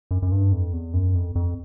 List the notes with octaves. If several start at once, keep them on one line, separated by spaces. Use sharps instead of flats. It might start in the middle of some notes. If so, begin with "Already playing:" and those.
F#2
F#2
G2
F2
E2
F#2
F2
F2